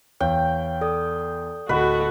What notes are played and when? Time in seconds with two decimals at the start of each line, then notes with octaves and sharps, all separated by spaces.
0.20 E2 C#5 F5 G5
0.81 A4 D5 D#6
1.69 D1 F#4 A4 B4 D#5 F#5